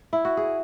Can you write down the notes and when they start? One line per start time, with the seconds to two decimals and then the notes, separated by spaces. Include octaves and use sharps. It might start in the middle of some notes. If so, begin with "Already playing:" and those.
Already playing: D4
0.13 E4
0.25 F#4
0.37 G#4